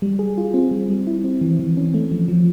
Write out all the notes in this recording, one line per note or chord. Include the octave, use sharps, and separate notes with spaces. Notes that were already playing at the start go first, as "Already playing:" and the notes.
G3
G#4
F4
C4
G3
G3
E4
C4
E3
E3
C#4
A3
F3
F3